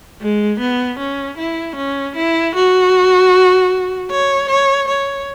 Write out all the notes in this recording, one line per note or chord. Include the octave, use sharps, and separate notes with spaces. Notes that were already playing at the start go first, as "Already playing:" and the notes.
G#3
B3
C#4
E4
C#4
E4
F#4
C#5
C#5
C#5